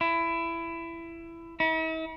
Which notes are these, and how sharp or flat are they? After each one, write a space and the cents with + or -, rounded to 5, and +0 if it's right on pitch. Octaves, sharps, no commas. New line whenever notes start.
E4 +20
E4 -45